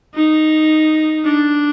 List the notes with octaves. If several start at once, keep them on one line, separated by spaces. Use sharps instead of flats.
D#4
D4